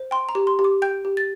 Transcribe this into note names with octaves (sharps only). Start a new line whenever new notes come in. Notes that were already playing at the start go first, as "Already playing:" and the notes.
Already playing: C5
G5 C6
A#5
G4
C6
G4
D6
G5 G6
G4
A6